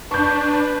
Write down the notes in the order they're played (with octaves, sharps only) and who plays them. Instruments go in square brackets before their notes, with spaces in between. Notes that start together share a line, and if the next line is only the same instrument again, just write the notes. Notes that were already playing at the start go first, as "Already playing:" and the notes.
[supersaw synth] D4 [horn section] B4 [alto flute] A5 [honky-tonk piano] C#6 G6